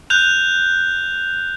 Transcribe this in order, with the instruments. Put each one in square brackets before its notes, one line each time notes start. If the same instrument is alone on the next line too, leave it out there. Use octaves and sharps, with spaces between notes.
[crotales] F#6 G6 F7